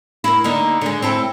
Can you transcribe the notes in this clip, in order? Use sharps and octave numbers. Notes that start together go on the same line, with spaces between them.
A#3 E4
D3 A#3 D#4
D3 G#3
C4 E4 A4